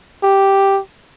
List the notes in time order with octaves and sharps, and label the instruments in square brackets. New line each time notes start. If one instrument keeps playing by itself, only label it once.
[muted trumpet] G4